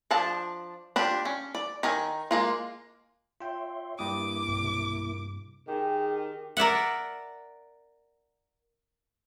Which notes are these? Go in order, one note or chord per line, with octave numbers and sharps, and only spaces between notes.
F3 D4 F5 A5
D4 F4 G4
C#4
D5
D#3 D#4 A#4 G#5
G#3 A#3 F4
F4 C#5 E5 G5 C6
G2 A#3 E4 D6 D#6
B1 G2 C3
D#3 G4 G#4 G#5
A#4 D5 E5 F#5